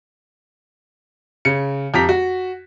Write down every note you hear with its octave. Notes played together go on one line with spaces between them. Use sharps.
C#3 C#7
F2 G4 A#5 B6
F#4